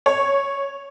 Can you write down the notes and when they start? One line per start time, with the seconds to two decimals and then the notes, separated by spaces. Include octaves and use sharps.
0.06 C#5